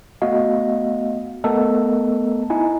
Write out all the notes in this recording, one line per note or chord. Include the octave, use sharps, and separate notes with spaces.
A3 B3 F#4 D#5 F5
A3 B3 A4 A#4 D#5
D#4 E4 G#5